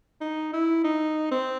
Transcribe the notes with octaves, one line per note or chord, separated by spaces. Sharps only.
D#4
E4
D#4
C4